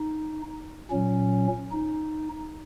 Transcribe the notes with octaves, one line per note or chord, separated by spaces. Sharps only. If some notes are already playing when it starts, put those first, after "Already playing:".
Already playing: D#4
A#2 F#3 C#4
D#4